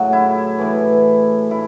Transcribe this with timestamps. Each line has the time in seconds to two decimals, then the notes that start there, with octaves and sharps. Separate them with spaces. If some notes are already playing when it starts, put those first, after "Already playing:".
Already playing: A2 C#3 F#3
0.13 E4
0.59 A2 E3
1.51 A2 E4